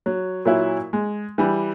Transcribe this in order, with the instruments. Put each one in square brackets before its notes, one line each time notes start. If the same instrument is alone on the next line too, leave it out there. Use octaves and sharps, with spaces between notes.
[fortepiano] F#3
A#2 F#3 E4
G#3
E3 G3